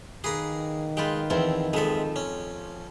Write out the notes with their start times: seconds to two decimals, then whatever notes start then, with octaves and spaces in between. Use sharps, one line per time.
0.24 D#3 A#3 G#4 B4 A#5
0.97 G#3 F4 B4 G5
1.30 E2 F3 C4 E4
1.73 F2 F3 G#3 E5
2.16 C#4